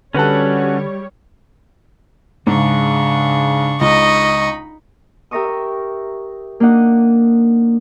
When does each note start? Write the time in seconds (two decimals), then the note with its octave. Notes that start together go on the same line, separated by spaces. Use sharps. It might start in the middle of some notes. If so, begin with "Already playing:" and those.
0.15 D3 G3 C#4 F#4 A4 B4 C#5 F#5
2.47 G#2 C#3 D4 C#6
3.81 C#2 D#4 D#5 B5 C#6
5.31 G4 A#4 E5 A#5 C#6 D#6
5.48 E5
6.60 A#3 D4 D#4 D#5 F#5